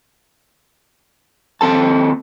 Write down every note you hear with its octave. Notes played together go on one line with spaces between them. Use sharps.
D#2 C4 A4 A5